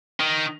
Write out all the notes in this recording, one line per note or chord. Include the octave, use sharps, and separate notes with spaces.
D#3